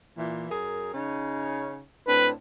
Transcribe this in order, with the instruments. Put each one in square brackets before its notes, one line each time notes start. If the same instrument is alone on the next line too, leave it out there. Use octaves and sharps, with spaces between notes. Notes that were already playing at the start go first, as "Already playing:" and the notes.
[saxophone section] A#2 E3
F#2 G#4 A#4
C#3 C#4 D#4
[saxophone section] A2 C4 D4 [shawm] B4